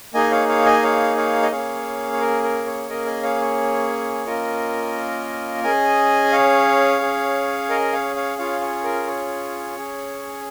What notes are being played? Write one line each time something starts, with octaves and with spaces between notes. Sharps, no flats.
A#3 D#4 G#4 D#5 G#5
C#5 F5
C#5 F5
D#5 G#5
C#5 F5
C#5 F5
D#5
A#3 C#4 G#4 C#5 F5
C#5
A#4
A#4
C#5
A#3 C#4 G#4 A#4 D#5
D#5 G#5
C#5 F5
C#5
A#3 C#4 F4 A#4 D#5
C#4 G#4 D#5 G#5
C#5 F5
C#4 G#4
A#4 D#5
C#5 F5
C#5 F5
C#4 F4 G#4 C#5 F5
C#5
A#4
C#5
C#4 G#4